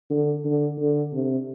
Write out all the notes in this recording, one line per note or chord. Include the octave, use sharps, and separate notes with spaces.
D3
D3
D3
C3